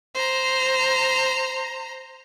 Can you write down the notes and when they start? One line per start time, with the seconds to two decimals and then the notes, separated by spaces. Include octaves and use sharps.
0.15 C5 A#5